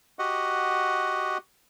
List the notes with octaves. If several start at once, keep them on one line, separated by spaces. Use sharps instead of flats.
F#4 G4 D#5 F#5